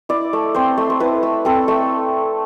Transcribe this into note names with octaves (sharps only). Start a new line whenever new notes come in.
E4 D5
A3
C4 C5
A3
C5
E4 B4
A3
C4 A4
A3